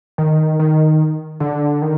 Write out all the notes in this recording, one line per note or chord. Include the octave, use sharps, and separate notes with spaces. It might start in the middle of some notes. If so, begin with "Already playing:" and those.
D#3
D#3
D3
D#3